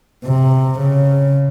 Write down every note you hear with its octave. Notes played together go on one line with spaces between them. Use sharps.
C3
C#3